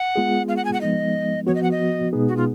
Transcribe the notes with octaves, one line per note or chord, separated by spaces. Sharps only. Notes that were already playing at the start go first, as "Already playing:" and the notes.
Already playing: F#5
G#3 B3 F4 G#4
F5
F#5
G#5
F#5
F3 G#3 B3 D#4 D#5
F3 B3 F#4 C#5
D#5
F#5
D#5
B2 G#3 B3 D#4 G#4
F#4
F4